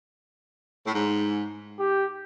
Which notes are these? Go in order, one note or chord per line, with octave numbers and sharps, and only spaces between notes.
A2
G#2
G4